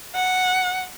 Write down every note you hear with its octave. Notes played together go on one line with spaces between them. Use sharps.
F#5